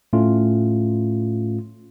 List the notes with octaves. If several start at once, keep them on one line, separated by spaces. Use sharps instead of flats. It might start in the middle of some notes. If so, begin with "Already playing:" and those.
A2 A3 C#4 F4